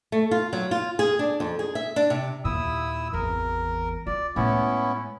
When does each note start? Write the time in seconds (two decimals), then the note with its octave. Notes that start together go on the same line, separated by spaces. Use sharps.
0.12 A3
0.31 F4
0.53 F#3
0.71 F4
0.99 G#4
1.19 D4
1.40 F2
1.59 G#4
1.75 E5
1.96 D4
2.10 C3
2.44 D#2 A#2 E4 D#6 E6
3.13 G#1 E2 A#4
4.07 F4 D5
4.36 A2 G#3 B3 C#4 E4